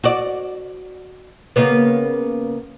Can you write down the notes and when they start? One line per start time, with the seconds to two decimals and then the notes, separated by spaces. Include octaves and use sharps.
0.04 F#4 D5
1.56 C#3 A#3 B3